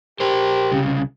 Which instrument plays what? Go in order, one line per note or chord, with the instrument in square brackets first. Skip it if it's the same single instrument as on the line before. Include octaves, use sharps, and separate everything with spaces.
[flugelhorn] G4 [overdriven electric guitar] A#4 C5
[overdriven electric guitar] C2 C#3